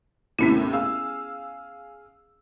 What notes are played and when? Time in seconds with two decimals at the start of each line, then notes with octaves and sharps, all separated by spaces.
0.39 D#2 A2 C3 B3 C#4 E4
0.73 G#4 F5 E6